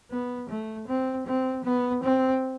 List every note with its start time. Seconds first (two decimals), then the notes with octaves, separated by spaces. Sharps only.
0.11 B3
0.49 A3
0.87 C4
1.27 C4
1.65 B3
2.04 C4